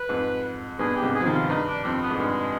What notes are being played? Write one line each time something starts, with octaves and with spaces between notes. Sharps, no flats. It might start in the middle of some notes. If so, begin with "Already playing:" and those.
Already playing: B4
F2 G#2
G2 B2 G#4
G4
G#2 C3
G#4
F3
C3 D#3
F4
G2 D#4
D4
F2 C4
B3
G#2
G2 G#3